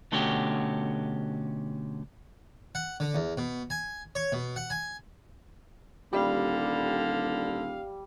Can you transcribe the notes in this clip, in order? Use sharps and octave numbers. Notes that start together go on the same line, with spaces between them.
B2 D3 A3 C#4 F#4 G4
F#5
D3
E2
B2
G#5
C#5
B2
F#5
G#5
D#1 D3 G3 F5